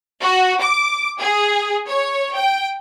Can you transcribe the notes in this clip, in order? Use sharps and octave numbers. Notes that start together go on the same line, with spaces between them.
F#4
D6
G#4
C#5
G5